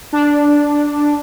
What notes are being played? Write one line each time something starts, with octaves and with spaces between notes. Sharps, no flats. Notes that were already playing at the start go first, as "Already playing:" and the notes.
D4